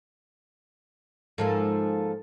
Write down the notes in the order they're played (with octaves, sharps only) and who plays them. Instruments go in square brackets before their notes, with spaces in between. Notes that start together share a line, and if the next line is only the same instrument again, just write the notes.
[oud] G#2 F3 A#3 [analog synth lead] A4